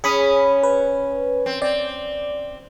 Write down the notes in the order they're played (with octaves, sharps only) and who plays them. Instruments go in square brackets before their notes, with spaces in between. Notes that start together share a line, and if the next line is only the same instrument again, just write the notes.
[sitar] C#4 [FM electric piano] G#4 B5 D#6
[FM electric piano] B4
[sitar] C4
[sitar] C4 [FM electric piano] D5